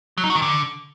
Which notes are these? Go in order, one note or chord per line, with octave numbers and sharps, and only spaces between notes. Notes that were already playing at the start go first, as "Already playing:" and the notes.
F#3
D#4
F#4
D#3
D3